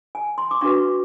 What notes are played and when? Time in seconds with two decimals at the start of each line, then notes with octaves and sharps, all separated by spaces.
0.15 G#5
0.38 C6
0.51 D6
0.61 D4 F#4 B4 C#6